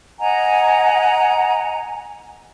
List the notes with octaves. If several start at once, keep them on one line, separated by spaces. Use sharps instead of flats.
D#5 F#5 G#5 A#5